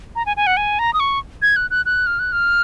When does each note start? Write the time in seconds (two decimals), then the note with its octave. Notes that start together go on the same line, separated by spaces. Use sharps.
0.16 A#5
0.26 G#5
0.37 G#5
0.47 F#5
0.57 G#5
0.79 A#5
0.93 D#6
1.00 C#6
1.42 G#6
1.56 F#6
1.71 F#6
1.86 F#6
2.07 F6
2.19 F#6
2.32 F6